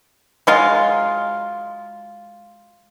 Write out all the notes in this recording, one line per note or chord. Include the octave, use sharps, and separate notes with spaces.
F#3 G#3 F4